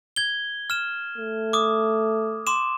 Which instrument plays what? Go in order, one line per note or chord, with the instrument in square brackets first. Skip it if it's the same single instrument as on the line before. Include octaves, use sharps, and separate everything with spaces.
[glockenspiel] G#6 G7
F6 E7
[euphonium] A3
[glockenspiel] D6 D#6
C6 D6 E7